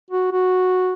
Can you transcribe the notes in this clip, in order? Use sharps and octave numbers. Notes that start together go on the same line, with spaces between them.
F#4
F#4